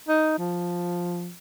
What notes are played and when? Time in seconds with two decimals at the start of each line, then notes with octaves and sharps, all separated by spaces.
0.08 D#4
0.38 F3